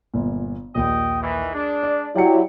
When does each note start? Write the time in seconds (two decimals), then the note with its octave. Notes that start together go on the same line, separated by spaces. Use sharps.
0.14 G1 A#2
0.75 A#1 D#2 D#5 G5
1.21 D#3 E3
1.54 G#3 D4
1.83 D5
2.16 F#3 E4 G4 D5 G5 C#7